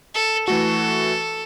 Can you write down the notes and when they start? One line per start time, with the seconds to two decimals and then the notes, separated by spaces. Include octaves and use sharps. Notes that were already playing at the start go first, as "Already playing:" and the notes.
0.15 A4
0.48 E3 A3 F#4 A4